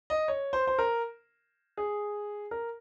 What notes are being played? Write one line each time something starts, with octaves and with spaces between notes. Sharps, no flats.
D#5
C#5
C5
C5
A#4
G#4
A#4